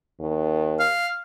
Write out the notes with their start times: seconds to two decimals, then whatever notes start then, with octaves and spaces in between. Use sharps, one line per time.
0.20 D#2
0.79 F5